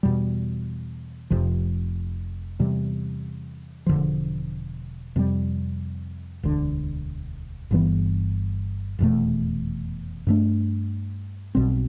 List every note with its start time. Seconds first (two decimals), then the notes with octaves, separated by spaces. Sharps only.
0.03 E2 B2 G3
1.30 F1 F2 C3 F3
2.59 E2 C3 G3
3.86 E1 D2 D3 F3
5.16 F2 C3 G3
6.43 E1 D2 D3
7.71 G1 G2 E3 B3
8.99 F1 E2 B2 A3
10.27 G2 D3 A3 D4
11.55 B1 B2 G3 C4